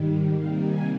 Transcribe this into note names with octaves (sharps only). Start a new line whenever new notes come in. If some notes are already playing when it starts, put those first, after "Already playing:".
Already playing: G#2 D#3 G3
C3 D#3 G3 A#3 F5
G#5